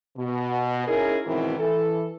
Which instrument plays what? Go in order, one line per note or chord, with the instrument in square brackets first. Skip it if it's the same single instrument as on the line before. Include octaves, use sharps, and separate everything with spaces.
[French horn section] B2
C#4 D#4 E4 G#4 A#4
G#2 B2 D#3 E3 C4 E4
E3 A4